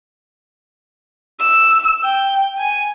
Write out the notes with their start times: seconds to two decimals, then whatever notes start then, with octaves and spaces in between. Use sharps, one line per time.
1.39 E6
2.04 G5
2.58 G#5